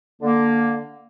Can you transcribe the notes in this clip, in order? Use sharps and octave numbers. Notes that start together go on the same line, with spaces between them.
D3 A#3